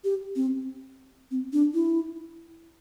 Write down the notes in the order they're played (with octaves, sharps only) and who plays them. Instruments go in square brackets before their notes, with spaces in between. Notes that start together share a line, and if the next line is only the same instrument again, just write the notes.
[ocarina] G4
C4
C4
D4
E4